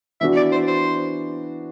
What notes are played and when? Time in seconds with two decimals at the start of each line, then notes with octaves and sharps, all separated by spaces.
0.21 E3 B3 D4 F#4 E5
0.36 D5
0.52 C5
0.68 C5